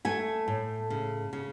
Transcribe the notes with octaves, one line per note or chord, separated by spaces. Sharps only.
A3 E5 G#5
A2
C#3
C#3